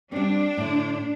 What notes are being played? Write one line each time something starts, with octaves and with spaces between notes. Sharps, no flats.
G3 C4 D4
A2 D3